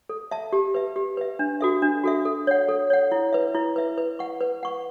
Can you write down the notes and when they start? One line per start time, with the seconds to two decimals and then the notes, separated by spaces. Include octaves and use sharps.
0.09 A4
0.31 E5 A5
0.53 G4
0.74 B4 E5
0.96 G4
1.17 B4 E5
1.39 D4
1.61 F#4 A4 E5
1.82 D4
2.04 F#4 A4 E5
2.25 A4
2.47 C#5 F#5
2.69 A4
2.90 C#5 F#5
3.12 E4
3.33 B4 E5
3.55 E4
3.76 B4 E5
3.98 B4
4.19 F#5 C#6
4.41 B4
4.63 F#5 C#6